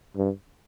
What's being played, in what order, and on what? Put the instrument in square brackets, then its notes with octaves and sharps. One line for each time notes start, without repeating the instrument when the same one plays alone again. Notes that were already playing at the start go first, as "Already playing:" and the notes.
[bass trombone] G2